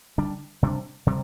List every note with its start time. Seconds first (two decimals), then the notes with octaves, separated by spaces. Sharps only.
0.18 D3 G3 D4
0.63 C3 G3 D4
1.07 C3 G3